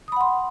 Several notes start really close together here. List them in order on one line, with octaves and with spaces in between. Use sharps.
D#6 B5 F#5 C6